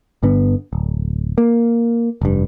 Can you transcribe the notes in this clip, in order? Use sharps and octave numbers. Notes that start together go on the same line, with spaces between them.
G1 G2 D3 B3
D1
A#3
F1 G2